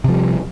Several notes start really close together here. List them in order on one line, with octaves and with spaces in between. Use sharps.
C3 F3 G3